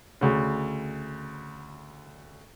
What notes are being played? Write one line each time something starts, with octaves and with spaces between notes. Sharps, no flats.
D2 C#3